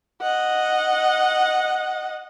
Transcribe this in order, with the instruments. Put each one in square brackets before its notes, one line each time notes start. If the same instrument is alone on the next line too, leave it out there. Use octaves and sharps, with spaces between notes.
[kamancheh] D#5 F#5